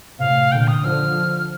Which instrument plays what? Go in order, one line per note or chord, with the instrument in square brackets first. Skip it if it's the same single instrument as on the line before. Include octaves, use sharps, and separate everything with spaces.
[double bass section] A2 C3 [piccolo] F5
[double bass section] A#2 D3 [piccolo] G5
[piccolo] D#6
[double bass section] D3 F3 [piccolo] F6